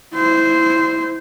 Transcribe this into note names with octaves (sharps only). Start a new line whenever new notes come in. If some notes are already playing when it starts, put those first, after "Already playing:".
E4 C5